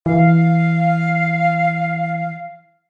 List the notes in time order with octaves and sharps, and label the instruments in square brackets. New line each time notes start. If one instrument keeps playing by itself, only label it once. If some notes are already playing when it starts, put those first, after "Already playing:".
[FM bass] E3 [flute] F5